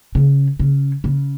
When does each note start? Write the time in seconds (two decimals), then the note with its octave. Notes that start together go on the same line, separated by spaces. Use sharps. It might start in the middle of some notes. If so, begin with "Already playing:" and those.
0.15 C#3
0.60 C#3
1.04 C#3